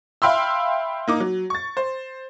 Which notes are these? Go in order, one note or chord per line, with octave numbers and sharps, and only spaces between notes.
E5 F5 G5 B5 C6 E6
A#3 D#4 D6
F#3
C#6 A6
C5